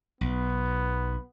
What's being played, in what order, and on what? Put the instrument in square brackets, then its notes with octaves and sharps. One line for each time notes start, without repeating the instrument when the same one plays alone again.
[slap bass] B1 [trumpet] B3